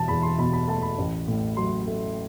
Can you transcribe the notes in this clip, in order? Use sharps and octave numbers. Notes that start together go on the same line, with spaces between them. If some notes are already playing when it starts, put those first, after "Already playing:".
Already playing: E1 A5
E2 B5
C6
B2 B5
B5
A3 A5
B5
A1
A2
F#3 C6
A3